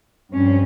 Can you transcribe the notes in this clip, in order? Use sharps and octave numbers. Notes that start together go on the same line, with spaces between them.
G2 F3 C4 C#4